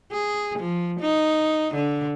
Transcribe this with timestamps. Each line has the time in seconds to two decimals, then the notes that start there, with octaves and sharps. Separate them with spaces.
0.12 G#4
0.59 F3
1.01 D#4
1.75 D3